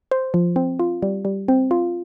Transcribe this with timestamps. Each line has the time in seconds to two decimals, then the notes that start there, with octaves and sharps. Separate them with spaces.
0.11 C5
0.34 F3
0.56 C4
0.79 F4
1.02 G3
1.25 G3
1.48 C4
1.71 F4